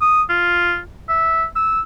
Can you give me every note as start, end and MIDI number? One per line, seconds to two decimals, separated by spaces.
0.01 0.23 87
0.29 0.80 65
1.09 1.45 76
1.56 1.81 88